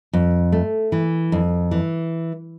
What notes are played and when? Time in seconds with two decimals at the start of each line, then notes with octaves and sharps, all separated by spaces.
0.13 F2
0.52 A3
0.92 E3
1.32 F2
1.71 E3